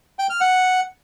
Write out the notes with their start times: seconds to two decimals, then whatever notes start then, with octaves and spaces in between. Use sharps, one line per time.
0.19 G5
0.30 F6
0.41 F#5